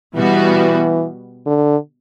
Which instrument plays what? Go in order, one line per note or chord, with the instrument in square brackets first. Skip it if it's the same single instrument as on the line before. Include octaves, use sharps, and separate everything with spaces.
[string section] B2 G3 B3 F#4 [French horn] E3
[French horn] D3